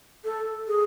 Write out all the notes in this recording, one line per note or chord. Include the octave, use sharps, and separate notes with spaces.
A4
G#4